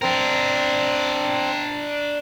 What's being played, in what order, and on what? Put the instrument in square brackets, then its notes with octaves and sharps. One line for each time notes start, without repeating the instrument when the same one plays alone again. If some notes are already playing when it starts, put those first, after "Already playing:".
[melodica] C4 [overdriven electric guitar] D4 A#4